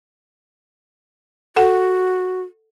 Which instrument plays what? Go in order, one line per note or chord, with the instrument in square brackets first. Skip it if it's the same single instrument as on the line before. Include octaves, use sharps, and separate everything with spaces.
[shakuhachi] F#4 [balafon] A4 F#5